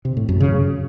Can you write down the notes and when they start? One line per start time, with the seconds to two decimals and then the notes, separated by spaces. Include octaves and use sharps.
0.05 C3
0.17 A2
0.29 F#2
0.40 C#3